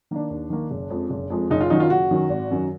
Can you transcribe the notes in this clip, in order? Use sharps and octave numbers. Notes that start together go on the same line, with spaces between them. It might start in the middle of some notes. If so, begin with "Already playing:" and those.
D#3 A#3 D4
D#2
D#3 A#3
F#1
F2 F3 G#3
F#1
F2 F3 G#3
F#1 D#4
F4
F#2 D#3 F#3 D#4
F4
F#1 F#4
F#2 D#3 F#3
G#1
F#2 D#3 F#3